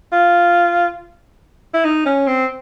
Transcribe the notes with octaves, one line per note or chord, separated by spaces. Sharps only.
F4
E4
D#4
C#4
C4